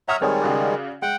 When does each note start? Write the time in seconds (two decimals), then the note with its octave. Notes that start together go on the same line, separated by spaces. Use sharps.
0.08 C#5 E5 F#5 A#5 D#6 F6
0.21 D#3 G3 G#3 C4 A4 C#5
0.42 C#3 F#4 D5
1.02 G#3 F#5 G5